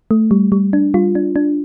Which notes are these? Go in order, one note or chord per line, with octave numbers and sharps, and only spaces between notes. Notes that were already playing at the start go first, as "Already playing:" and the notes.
A3
G3
G3
D4
G3 F4
D4
D4